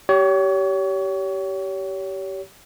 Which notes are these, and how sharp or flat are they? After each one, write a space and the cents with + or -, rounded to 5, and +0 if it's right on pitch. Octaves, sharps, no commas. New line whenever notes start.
G4 -20 C#5 +30